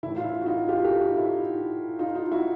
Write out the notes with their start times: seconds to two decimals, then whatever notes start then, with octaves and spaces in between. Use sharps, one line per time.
0.03 E3 E4
0.06 A2
0.17 F4
0.24 E4
0.41 F#4
0.46 D#4 F4
0.68 F4 G4
0.84 G4 A4
1.01 D#4
1.17 E4
1.99 D#4 F4
2.15 D#4 F4
2.32 E4 F#4